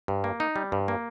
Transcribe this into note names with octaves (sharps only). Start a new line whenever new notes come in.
G2
A#3
D#4
G3
G2
A#3